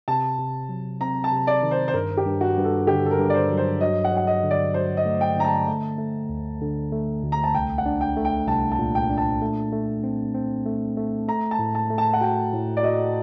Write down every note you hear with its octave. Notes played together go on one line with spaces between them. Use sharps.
C3 A5
C3
F#3
C4 A#5
A5
C3
D5
D#3
C5
C5
G2 A#4
G4
G2
F#4
G2
A4
D3 G4
A4
A#4
G2
D5
C5
F#3
C5
F#3 D#5
F#5
F#3
F#5
D#5
D3
D5
F#3 C5
D#5
A3
G5
D3 A#5
A5
A3
A3
D2
D3
A3
D2
A#5
A5
C2 G5
F#5
D4
G5
A3
G5
C2 A5
A5
A#2
G5
D4
A5
A3
A3
C4
C4
A3
A3
A3 A#5
A5
A2
A5
A3
A5
F#5
F#4 G5
A2
D5
F#4 D#5